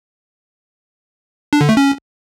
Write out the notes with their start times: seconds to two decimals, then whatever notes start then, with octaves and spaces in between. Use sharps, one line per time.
1.53 D4
1.61 D3
1.69 A3
1.77 C#4